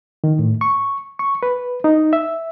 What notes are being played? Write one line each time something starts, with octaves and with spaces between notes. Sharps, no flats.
D#3
A2
C#6
C#6
B4
D#4
E5